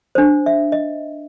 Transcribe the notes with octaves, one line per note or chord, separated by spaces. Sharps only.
D4 C5
E5
D#5